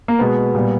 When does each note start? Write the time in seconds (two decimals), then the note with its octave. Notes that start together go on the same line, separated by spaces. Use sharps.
0.08 A#3
0.19 B2 G#3 B3
0.55 A#2 G3